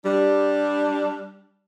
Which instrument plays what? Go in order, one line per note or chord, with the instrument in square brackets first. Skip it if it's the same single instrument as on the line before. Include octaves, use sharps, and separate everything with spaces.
[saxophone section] G3 D4